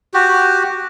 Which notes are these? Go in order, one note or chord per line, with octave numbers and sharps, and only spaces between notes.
F#4 G4